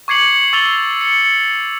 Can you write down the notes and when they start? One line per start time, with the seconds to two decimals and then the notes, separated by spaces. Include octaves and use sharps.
0.08 C#6 D6 G#6 C7 C#7 F#7
0.53 C#6 E6 A6 C7 F7 G7
1.01 C#7